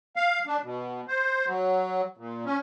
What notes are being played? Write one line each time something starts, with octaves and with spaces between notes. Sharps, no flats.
F5
D4
B2
C5
F#3
A#2
C#4